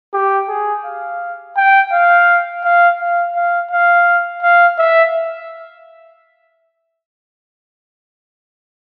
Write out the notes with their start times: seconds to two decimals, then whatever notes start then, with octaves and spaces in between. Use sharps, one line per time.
0.14 G4
0.49 G#4
0.85 F5
1.57 G5
1.92 F5
2.64 F5
3.00 F5
3.35 F5
3.71 F5
4.42 F5
4.79 E5